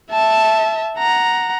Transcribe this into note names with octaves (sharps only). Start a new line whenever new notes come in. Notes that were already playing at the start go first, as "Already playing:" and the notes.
E5 A5
F#5 A#5